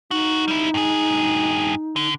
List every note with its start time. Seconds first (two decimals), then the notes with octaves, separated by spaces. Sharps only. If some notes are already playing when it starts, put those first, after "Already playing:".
0.11 A#3 D#4 F#4
0.48 G3 E4
0.74 G2 G#4
1.96 D3